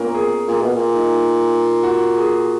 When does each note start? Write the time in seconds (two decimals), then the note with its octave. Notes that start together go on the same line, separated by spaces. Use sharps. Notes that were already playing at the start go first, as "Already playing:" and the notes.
Already playing: A#2 B3 C#4 A#4
0.14 G#4
0.48 A#2 G#4
0.62 B2
0.75 A#2
0.94 D#4
1.83 F#4
2.17 G#4